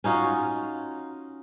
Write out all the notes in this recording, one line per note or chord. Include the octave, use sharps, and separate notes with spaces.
C#4 D#4 F4 F#4